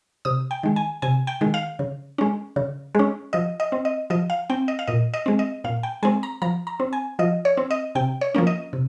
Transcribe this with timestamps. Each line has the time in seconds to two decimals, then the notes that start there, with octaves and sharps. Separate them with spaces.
0.25 C3 D#6
0.51 G5
0.63 D#3 G#3
0.76 G#5
1.02 C3 G#5
1.27 G5
1.41 D#3 G#3
1.54 F5
1.79 C#3
2.18 G#3 C#4
2.56 C#3
2.95 G#3 C#4
3.33 F3 D#5
3.60 D#5
3.72 C4
3.85 D#5
4.10 F3 D#5
4.30 F5
4.50 C4 G5
4.68 D#5
4.79 F5
4.87 A#2 D#5
5.14 D#5
5.26 G#3 C4
5.39 D#5
5.64 A#2 F5
5.83 G5
6.03 G#3 C4 G#5
6.23 A#5
6.42 F3 A#5
6.67 A#5
6.80 C4
6.93 G#5
7.19 F3 D#5
7.45 C#5
7.57 C4
7.71 D#5
7.95 C3 G5
8.21 C#5
8.35 F3 A#3 C#4
8.47 D#5
8.73 C3